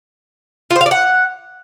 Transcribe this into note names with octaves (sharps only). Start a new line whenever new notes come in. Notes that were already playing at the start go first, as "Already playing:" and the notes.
F4
C5
F5
D5
F#5